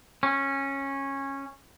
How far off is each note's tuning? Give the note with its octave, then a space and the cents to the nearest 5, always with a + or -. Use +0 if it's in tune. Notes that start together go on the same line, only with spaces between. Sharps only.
C#4 -15